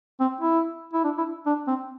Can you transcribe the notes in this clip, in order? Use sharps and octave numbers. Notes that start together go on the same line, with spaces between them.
C4
E4
E4
D4
E4
D4
C4